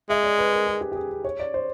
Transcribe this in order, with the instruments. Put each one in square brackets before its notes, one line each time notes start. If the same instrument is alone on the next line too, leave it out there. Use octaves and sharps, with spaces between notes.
[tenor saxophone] G#3 [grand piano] E5
[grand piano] D5
B4
A#4
G#4
G4
G4
G#4
G#4
C#5
D5
C5